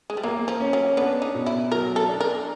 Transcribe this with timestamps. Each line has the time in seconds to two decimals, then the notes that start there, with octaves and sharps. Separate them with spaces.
0.10 G#3
0.17 G3
0.23 F#3 A#3
0.48 F3
0.60 C#4
0.73 F#3
0.97 B3 D4
1.22 D#4
1.35 B2
1.46 E4
1.72 F#3 A#4
1.96 A4
2.08 D4
2.21 A#4